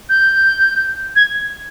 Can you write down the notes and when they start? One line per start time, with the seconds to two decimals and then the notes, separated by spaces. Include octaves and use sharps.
0.09 G6
1.16 G#6